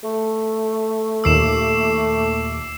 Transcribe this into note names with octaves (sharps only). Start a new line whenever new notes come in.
A3
D#2 A#2 D6 E6 C7 E7